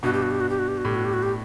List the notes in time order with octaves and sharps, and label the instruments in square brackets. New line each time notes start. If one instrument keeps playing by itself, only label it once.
[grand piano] G2 B2 [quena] F#4
[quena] G4
F#4
G4
F#4
G4
F#4
G4
F#4
[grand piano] A2 [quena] G4
[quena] F#4
G4
F#4
G4